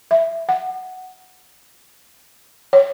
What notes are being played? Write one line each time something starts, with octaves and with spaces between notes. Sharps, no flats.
E5
F#5
C#5